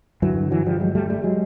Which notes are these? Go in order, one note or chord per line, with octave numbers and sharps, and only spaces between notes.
G2 D3 E3 F#3
E3 F#3
F3 G3
F#3 G#3
G3 A3
G3 A3
F#3 G#3